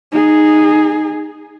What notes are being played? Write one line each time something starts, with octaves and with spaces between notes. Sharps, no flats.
D#4 G#4